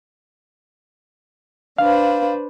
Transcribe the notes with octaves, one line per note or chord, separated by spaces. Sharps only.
D4 B4 C5 F5